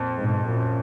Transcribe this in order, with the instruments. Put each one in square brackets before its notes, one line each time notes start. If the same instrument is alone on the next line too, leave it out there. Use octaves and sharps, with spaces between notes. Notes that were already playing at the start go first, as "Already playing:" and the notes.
Already playing: [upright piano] F2 [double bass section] A#2
[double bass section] G#2 B2
F#2 A#2